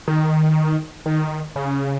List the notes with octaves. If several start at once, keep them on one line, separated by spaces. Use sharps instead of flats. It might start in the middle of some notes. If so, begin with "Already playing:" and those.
D#3
D#3
C#3